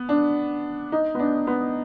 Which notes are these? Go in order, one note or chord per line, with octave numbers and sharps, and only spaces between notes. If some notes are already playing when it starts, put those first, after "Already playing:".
Already playing: B3
D4
D#4
B3
D4
B3